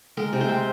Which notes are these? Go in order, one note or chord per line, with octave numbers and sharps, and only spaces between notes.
G#3 A#4
C3
C5
C4